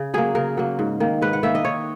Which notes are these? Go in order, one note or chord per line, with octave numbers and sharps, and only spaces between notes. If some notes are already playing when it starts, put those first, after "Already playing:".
Already playing: C#3
F#3 A#3 G#4
C#3 A#4
F#3 A#3
G#2
D#3 A#3
G#2 B4
F#5
D#3 A#3 E5
D#5
D#3 C#5